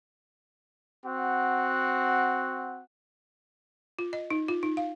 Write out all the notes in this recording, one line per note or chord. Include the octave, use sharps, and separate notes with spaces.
C4 F#4 F#5
F4
D#5
D#4
F4
D#4
F5